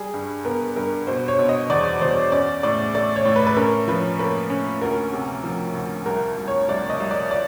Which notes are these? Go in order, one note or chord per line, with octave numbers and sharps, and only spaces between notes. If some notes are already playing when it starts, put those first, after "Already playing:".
Already playing: G3 G#4
G2
B3 A#4
G2 A#4
B2 C5
C#5
B2
D#5
E2 D5
E2 C5
C#4 D5
A2 D5
A3 D5
C#5
A2
B4
B4
C#4 A#4
F3 B4
A#3 B4
C#4
D2 A#4
C3
F3
D2
C2 A#4
C2
C#5
C2 D5
D#5
C2
D5
D5